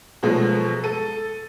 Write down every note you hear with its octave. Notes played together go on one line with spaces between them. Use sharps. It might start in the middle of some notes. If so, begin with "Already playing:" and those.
B2 F3 F#3 G#3 A3
A4 D#7